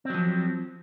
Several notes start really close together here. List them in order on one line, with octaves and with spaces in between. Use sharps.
C4 F#3 F3